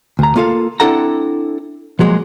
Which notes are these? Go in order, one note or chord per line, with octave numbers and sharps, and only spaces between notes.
D2 A#5
A#3 F4 A4 F5
C4 D4 E4 A4 F#5 A#5
F3 F#3 G#3 A#3